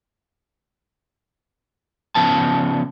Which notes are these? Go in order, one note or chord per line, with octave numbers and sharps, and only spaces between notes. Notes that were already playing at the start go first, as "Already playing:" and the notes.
C#3 F3 B3 A5